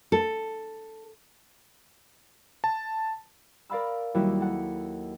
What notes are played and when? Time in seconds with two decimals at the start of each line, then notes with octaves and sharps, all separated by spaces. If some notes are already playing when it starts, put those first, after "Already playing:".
0.12 A4
2.64 A5
3.70 A#4 D5 F5 B5 E6
4.14 D#2 F#3 G3 E4 F#4
4.41 A4 F#5